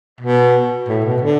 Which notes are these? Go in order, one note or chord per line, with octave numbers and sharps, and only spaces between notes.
B2
A2
B2
D3